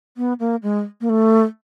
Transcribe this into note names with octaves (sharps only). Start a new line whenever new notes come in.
B3
A#3
G#3
A#3
A3